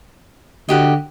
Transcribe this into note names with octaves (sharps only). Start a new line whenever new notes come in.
D3 F#4 G4 D#5